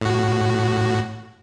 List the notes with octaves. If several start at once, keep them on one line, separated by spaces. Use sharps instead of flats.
A2 F#4